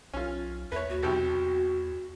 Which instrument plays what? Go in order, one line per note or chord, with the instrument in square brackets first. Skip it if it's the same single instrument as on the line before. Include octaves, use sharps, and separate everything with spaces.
[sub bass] B1 [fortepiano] C#4 F4
[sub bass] E2 [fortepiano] B4 C#5 [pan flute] E5
[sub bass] D#2 [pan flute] F#4
[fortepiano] B1 C3 G4 [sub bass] E2